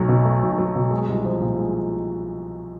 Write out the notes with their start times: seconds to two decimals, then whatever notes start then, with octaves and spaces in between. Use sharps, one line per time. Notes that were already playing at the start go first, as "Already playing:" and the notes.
Already playing: B1 F#3 A3
0.08 B2
0.25 A3
0.43 B1
0.58 F#3
0.75 B2
0.91 G#3
1.08 C2
1.24 F3
1.41 A#2
1.58 G#3